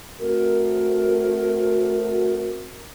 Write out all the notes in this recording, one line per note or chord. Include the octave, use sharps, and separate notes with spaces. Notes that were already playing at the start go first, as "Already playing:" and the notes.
A3 C4 F#4 A#4